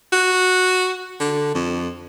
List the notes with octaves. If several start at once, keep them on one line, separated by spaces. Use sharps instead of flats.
F#4
D3
F2